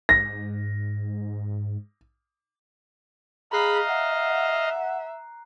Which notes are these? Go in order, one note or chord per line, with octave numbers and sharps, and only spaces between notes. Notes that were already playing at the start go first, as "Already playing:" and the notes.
G#2 A#6
G#4 D#5 F5 A#5 B5 F#6 C7
E5 F#5